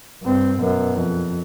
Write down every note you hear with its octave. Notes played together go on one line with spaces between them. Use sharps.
G2 C4
F#2 B2
F2